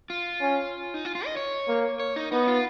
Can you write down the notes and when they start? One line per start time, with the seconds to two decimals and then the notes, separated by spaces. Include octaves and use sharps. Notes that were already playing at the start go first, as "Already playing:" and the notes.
0.10 F4
0.41 C#4
0.94 D#4
1.05 F4
1.15 F4
1.26 D#5
1.37 C#5
1.68 A#3
2.00 C#5
2.16 D#4
2.31 B3 D#4
2.47 F4